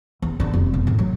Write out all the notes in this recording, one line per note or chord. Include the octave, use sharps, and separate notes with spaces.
E2
D3
F1
B2
A2
F#3